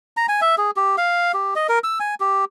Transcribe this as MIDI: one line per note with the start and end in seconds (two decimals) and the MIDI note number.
0.17 0.26 82
0.28 0.41 80
0.41 0.55 76
0.58 0.71 68
0.76 0.96 67
0.98 1.32 77
1.34 1.54 67
1.56 1.67 75
1.69 1.79 70
1.84 1.99 88
2.00 2.15 80
2.20 2.45 67